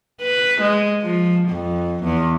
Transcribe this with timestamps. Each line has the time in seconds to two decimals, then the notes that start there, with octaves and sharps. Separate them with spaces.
0.21 B4
0.61 G#3
1.02 F3
1.49 F2
2.03 E2